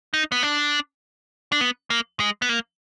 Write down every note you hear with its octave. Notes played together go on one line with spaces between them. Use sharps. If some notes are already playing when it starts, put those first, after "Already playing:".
D#4
B3
D4
D4
B3
A#3
G#3
B3
A#3